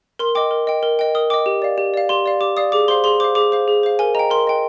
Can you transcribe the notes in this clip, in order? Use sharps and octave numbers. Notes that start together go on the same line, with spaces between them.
A#4 C6
D#5 G5 D6
A#4
D#5 G5
A#4
D#5 G5
A#4 D#6
D#5 G5 D6
G4
D5 F5
G4
D5 F5
G4 C6
D5 F5
G4 D6
D5 F5 D#6
G#4 D6
C5 F5 C6
G#4 C6
C5 F5 D6
G#4 D6
C5 F5
G#4
C5 F5
A#4 G#5
D#5 G5 A#5
A#4 C6
D#5 G5